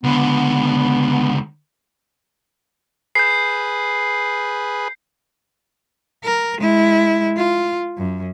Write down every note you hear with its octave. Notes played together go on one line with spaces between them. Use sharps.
C#2 D3 B3
G#4 B4 G6 C7
A#4
G#3 E4
F4
F#2